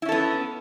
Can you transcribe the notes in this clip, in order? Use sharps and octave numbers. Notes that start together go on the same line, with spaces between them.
B3 C#4 E4 A4